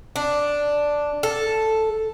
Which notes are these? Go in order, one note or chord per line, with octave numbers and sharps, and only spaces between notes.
D4
A4